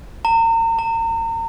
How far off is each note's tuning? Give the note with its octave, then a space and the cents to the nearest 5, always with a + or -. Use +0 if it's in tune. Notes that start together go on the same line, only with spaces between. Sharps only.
A#5 -35
A#5 -35